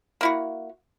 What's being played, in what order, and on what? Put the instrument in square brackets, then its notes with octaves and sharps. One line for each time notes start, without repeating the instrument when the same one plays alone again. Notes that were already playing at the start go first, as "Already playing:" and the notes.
[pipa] A#3 E4 F#4